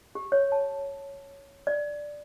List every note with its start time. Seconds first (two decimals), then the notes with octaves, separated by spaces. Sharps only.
0.15 G4
0.32 C#5
0.52 A5
1.67 D5